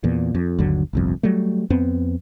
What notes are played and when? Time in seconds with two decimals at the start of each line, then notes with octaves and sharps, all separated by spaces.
0.04 E2 A#2
0.35 F2
0.59 G1 D#2 D3 F#3
0.93 G1 C2 F2
1.23 F#3 G3 A3
1.70 F2 B3 C4